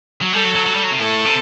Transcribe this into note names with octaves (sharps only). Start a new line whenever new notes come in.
F#3
G3 A4
F#3
F#3
F#3
G3
F#3
C3
A2 A4
C3